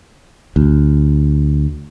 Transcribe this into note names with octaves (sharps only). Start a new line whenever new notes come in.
D2